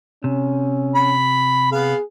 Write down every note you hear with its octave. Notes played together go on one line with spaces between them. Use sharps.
C3 C#4
B5
B3 G#4 F5